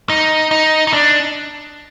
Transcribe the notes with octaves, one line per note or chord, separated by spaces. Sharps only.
D#4
D#4
D#4
D4